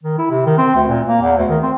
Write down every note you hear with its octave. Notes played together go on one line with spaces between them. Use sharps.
D#3
E4
C3
D#3
C4
D2
A#2
A#3
E2
D2
D#3
C4